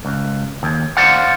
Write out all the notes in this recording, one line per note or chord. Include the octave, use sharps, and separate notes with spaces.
C#2
D#2
C5 D5 F5 F#5